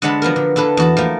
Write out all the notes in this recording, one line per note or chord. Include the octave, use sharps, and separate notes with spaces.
D3 G#3 C4 F#5 A5 B5
F3 B3 F#4 A#4
D3
D3 E4 A4 B4
E2 F#4 A5
F3 A3 A#3